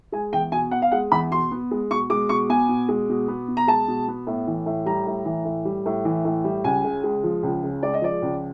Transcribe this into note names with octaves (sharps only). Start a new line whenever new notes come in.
G#3 G#5
E2 G5
B2 G#5
B3 F#5
F5
G#3 F#5
E2 B5
B2 C6
B3
G#3
B2 C#6
G#3 D6
B2 C#6
B3 G#5
B2
G#3
B2
B3
B2
A#5
G#3 A5
B2
B3
A2
E3
A2
G3 A#5
A2
E3
A2
G3
A2
E3
A2
G3
C#2 G#5
C#3
G#3
F3
C#2
C#3
G#3 D5
D#5
F3 D5
C#2